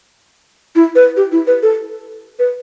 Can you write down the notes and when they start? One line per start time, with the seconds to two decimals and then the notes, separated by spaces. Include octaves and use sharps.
0.76 E4
0.96 B4
1.17 G4
1.32 E4
1.47 B4
1.63 A4
2.39 B4